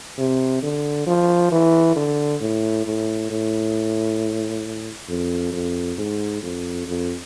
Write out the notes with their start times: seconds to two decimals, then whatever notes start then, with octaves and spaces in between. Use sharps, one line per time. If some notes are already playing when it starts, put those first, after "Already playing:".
0.18 C3
0.62 D3
1.07 F3
1.51 E3
1.96 D3
2.41 A2
2.85 A2
3.30 A2
5.08 F2
5.53 F2
5.98 G#2
6.42 F2
6.87 F2